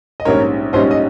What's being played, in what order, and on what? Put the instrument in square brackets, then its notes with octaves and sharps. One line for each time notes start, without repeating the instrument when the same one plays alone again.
[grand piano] D#5
[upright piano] A#1 G#2 G3 C#4 [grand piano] A#4 C#5
[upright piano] A#1 G#2 G3 C#4 [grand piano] C5 D#5
[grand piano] D#5